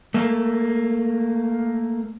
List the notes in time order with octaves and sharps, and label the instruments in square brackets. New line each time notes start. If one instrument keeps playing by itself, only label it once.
[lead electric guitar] A3 A#3